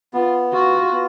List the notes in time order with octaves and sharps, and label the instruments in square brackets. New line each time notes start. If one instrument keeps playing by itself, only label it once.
[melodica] B3 [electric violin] F4
[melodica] F4 [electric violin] F#4
[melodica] B3